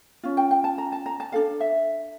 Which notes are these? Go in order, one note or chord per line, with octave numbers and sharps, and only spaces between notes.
C#4 F4
G5
G5
A5
A#5
A5
A#5
A5
D4 A4 F5
E5